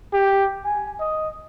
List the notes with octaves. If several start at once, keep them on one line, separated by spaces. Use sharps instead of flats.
G4
G#5
D#5